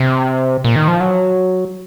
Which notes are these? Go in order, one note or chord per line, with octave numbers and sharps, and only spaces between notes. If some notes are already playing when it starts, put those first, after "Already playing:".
Already playing: C3
A#2
D#3
F3
F#3